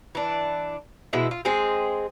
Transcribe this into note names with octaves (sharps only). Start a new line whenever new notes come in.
E3 D4
B2 E3 G#3 E4
F4
G#3 C4 G#4